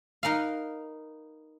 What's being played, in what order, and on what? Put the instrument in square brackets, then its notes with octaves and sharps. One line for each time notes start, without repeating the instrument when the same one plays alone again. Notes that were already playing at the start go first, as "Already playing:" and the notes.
[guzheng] D#4 A#4 B4 F5